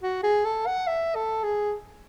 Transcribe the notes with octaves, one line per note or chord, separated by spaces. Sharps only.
F#4
G#4
A4
F#5
E5
A4
G#4